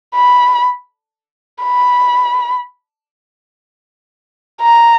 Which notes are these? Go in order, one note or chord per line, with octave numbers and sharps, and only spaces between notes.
B5
B5
A#5